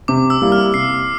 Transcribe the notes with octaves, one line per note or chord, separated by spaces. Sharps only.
C3 D6
E6
G3 A#3 E4
F6
C3 C7